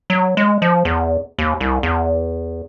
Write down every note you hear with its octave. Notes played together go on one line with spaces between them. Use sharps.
F#3
G#3
F3
E2
D#2
C2
E2